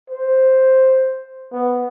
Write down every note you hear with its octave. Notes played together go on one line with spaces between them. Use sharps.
C5
B3